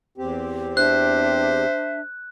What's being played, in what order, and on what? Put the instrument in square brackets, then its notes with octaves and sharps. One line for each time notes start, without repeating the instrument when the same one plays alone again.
[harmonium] E2 C4 G4
[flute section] D4 E5 [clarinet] C5 [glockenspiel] F#6